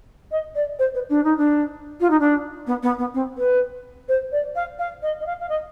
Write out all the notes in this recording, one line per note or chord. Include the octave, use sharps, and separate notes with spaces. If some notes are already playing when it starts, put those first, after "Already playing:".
D#5
D5
C5
B4
D4
D#4
D4
F4
D#4
D4
B3
B3
B3
C4
B4
C5
D5
F5
F5
D#5
D#5
F5
F5
D#5